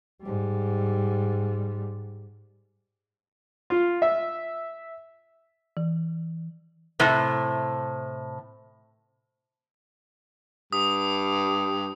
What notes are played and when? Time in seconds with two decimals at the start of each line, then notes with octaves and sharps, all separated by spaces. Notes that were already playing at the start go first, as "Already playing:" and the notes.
0.23 G#2 G3
3.70 F4
4.02 E5
5.77 E3
7.00 A2 C3
10.73 G2 D#6